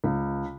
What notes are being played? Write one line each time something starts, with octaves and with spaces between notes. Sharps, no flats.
C#2